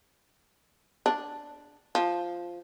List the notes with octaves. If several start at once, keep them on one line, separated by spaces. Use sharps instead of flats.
D4
F3